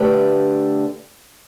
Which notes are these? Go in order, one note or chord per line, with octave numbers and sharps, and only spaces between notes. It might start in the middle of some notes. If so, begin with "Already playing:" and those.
Already playing: D3 A3 G4 B4 D5